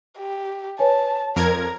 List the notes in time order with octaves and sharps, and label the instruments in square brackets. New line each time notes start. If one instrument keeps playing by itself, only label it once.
[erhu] G4
[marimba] B4 C#5 G#5 [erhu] A5
[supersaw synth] F2 A#4 G#6 [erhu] A#5